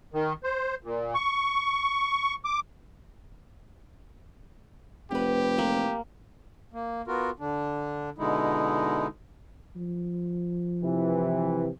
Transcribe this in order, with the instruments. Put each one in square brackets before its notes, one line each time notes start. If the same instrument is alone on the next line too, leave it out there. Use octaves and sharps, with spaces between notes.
[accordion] D#3
C5
A#2
C#6
D6
[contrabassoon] F1 [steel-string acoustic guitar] B3 B4 [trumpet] G4
[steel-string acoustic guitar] D3 E3 [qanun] A#3
[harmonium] A#3
B3 F4 F#4 A#4
D3 D4
B2 D3 G#3 D#4 E4
[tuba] F3
[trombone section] C3 E3